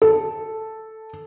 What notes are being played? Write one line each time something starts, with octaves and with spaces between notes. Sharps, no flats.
A4